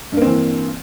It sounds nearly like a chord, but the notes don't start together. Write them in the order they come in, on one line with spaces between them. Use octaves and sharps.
G2 A#3 C4 E3